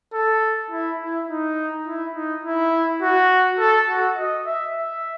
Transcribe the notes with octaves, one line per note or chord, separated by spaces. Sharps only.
A4
E4
E4
D#4
E4
D#4
E4
F#4
A4
F#4
D#5
E5
E5